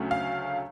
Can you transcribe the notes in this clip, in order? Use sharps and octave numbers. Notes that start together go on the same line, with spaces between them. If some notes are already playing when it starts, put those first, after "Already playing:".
Already playing: D2 C#3 F#3 A3 C#4
F5